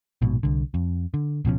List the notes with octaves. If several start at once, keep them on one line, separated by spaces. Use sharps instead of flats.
A#1 G#2 B2
C2 D3
F2
D3
D1 B2 F3 C#4